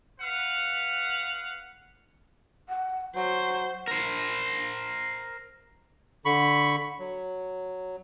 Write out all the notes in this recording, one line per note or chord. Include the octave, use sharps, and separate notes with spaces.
B4 F5 F#5
F#5
F#3 C5 F#5
A#4 C5
D3 B5 C#6
F#3